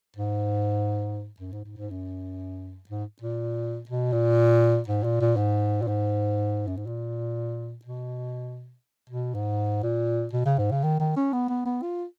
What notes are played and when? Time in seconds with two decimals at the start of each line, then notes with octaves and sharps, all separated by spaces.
0.17 G#2
1.40 F#2
1.52 G#2
1.65 G#2
1.77 G#2
1.90 F#2
2.89 G#2
3.22 A#2
3.89 B2
4.13 A#2
4.88 G#2
5.04 A#2
5.21 A#2
5.37 G#2
5.82 A#2
5.87 G#2
6.67 F#2
6.77 G#2
6.87 A#2
7.85 B2
9.10 B2
9.35 G#2
9.83 A#2
10.33 B2
10.45 C#3
10.58 G#2
10.71 C#3
10.84 D#3
11.00 D#3
11.16 C#4
11.33 B3
11.49 B3
11.65 B3
11.82 F4